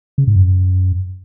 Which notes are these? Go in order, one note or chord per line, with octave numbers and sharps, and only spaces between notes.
C#3
G#2
F#2